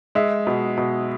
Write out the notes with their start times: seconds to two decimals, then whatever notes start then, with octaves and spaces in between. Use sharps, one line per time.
0.15 G#3 E5
0.47 B2
0.77 B2